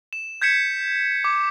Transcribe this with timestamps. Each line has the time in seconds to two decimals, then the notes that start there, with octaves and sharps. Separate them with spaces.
0.13 E7
0.42 G6 G#6 B6 C#7 E7
1.24 D6